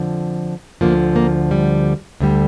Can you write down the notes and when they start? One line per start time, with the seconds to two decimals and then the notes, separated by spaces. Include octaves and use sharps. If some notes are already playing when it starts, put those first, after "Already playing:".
Already playing: F2 D3 F3
0.81 D2 D3 F3 A#3
1.16 A#3
1.51 G3
2.20 D2 D3 G3